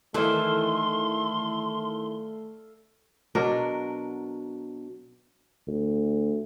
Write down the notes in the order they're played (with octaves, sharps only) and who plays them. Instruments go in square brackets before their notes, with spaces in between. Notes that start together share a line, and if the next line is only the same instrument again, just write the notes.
[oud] D#3 E3 [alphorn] A3 [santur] A4 D5 F5 [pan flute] C6
[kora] B2 F#3 D4 A#4
[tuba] D2